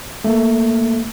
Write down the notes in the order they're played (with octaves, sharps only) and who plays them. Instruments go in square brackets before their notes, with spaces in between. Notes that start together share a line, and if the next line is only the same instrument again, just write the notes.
[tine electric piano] A3 A#3